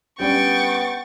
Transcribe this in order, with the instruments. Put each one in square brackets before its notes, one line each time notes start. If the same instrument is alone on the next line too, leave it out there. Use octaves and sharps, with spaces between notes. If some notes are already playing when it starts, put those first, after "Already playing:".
[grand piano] G3 C#4 D4 [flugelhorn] B3 [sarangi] G5 [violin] C#6 A6